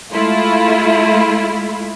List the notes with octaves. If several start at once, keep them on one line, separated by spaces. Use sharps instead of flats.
G#3 A3 E4 F4